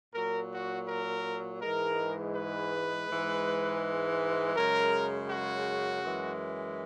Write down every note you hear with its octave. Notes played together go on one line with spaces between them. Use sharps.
A#2 F#3 A#4
F#4
A#4
G#2 E3 G#3 A#4
B4
G#2 E3 G#3
F#2 C#3 G#3 A#4
F#4
F#2 E3 G#3